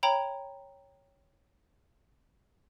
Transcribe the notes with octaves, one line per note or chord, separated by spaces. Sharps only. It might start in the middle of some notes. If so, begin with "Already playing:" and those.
C#5 G5 A#5 B5